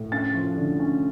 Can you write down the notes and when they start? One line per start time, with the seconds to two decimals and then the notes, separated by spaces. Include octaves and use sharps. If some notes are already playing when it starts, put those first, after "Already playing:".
Already playing: A2
0.12 C#4 A6
0.34 F3
0.57 D3
0.80 C#4